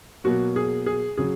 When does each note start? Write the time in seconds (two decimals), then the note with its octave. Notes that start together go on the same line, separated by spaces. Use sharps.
0.24 B2 F#3 A#3 F#4
0.56 G#4
0.86 G#4
1.17 C#3 F#3 G#4